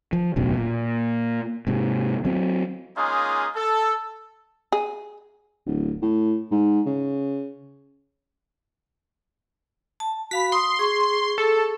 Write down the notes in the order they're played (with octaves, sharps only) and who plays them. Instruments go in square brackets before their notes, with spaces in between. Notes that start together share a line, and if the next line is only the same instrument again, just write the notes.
[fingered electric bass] F3
E1 A1 F#2 B2
A#2
G#2 C3
F#3 C4
[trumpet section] G#3 A#3 C#4 D#4 F4 G#4
A4
[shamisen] G#4
[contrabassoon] D1
A2
G#2
C#3
[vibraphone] A5
[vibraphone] F#4 F5 B5 [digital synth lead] B6
[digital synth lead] C6 [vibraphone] D#6
[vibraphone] G#4 C#6
[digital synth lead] A4